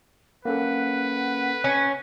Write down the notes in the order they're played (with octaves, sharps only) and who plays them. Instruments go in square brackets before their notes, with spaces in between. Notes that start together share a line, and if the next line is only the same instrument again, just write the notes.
[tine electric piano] A#3 C#4 A4 [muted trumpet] B4 [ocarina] F#5
[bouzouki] C#4